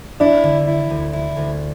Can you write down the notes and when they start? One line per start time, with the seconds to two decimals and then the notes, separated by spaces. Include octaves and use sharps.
0.20 D4 E4
0.44 D3
0.67 E4
0.90 D2
1.13 E4
1.37 D2